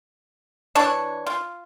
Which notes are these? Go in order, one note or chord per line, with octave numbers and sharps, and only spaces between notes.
E3 D4 C#5
F4